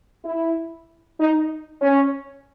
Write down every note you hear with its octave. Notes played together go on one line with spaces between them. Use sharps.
E4
D#4
C#4